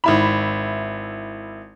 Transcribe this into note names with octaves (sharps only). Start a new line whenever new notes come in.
G#1 E4 B5